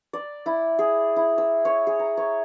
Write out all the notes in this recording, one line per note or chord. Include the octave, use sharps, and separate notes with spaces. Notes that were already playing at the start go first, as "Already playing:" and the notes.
D5
E4
G#4
E4
E6
C#5
G#4
A#5
C#5